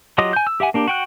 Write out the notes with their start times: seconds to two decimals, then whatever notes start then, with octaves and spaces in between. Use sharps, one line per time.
0.18 F#3 F4 G4 D#5 D#6
0.33 G#5 G6
0.47 E6
0.60 G4 E5 F#5 G#5
0.74 A#3 D4 G4
0.88 F#4 G5 F#6